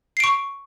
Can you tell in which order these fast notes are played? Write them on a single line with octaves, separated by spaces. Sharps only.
C7 D7 C#6